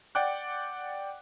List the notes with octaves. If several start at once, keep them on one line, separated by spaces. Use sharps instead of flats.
D5 F#5 G5 D6 F#6